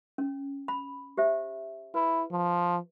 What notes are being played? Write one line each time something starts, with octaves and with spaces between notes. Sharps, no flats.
C#4
B5
G4 C5 E5
E4 B4
F3